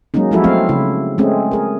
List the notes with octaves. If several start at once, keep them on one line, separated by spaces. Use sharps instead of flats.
F#3 G#3 A#3 C#4 D#4
F3 F#3 G#3 E4 F#4 A4
F#3 A3 C4 F5
C#3 E4
G#3 A3 C4 C#4 G#4
G#4 A#4